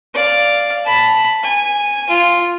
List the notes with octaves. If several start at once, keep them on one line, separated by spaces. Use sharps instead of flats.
D5 F5
A5 B5
G#5
F4